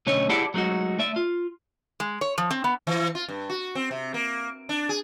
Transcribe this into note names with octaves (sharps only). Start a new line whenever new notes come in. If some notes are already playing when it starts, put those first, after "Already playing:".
B1 D3 A3 C#4 D#4 C#5
E4 G4 G#4 D5 F#5 A5
F#3 G#3 A3 D#4 F#4
A3 D5 E5
F4
G#3
C#5
F3
C4
B3
E3
F4
G2
F#4
C4
C3
A#3
D4
G#4